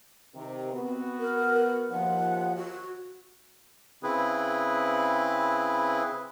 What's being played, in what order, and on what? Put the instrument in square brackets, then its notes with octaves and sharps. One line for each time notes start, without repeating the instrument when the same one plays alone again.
[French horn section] C3 D#3
[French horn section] B3 F#4 [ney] C4
[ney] A#4
[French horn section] D#2 F3 [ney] F#5
[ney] F#4
[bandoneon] C#3 C4 E4 G#4 B4